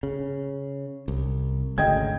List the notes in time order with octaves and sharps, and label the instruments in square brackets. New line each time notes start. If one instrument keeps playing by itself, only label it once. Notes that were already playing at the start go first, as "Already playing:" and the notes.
[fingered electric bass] C#3
C2
[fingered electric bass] G#1 D2 C#3 [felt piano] D#5 G5 G#6